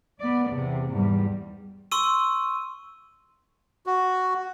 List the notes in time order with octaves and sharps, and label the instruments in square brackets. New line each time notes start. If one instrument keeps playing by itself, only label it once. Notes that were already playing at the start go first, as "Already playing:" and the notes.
[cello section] B3 D5
E2 C3
E2 G#2 G3
[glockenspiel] C6 C#6 E6 D#7
[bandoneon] F#4